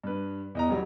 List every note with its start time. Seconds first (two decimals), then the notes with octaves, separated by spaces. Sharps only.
0.04 G2 B4
0.55 E2 D#5 A#5
0.69 A1 F#3 G3